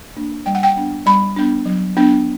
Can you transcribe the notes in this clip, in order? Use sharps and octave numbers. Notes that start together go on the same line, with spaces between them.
A#3 D4
G3 G5
F#5
G5
B3 D4
G3 B5
B3 D4
F#3
B3 D4